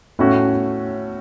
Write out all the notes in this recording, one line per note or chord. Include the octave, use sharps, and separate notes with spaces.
A2 A3 C#4 F#4